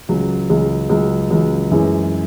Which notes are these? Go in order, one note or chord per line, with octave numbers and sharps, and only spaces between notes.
C#2 C#3 F#3
C#2 C#3 F#3
C#2 C#3 F#3
C#2 C#3 F#3
F#2 C#3 E3 G#3